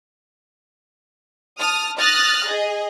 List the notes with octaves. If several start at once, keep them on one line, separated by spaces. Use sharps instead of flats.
A5 D#6 F6
D#6 F6 F#6 A6 A#6
G#4 D#5